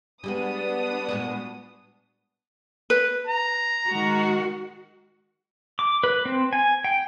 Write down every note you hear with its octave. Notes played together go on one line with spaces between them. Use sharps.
G3 G#3 B3 D4 F#4 D#6
A#2 G#3 F#4
B4
A#5
D#3 G#3 F#4
D6
B4
C4
G#5
G5